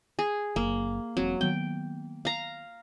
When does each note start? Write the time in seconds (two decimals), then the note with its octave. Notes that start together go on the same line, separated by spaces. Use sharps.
0.19 G#4
0.56 F#1 A#3
1.17 E1 F#3 C4
1.41 D#3 F#3 B3 G5
2.25 F5 A#5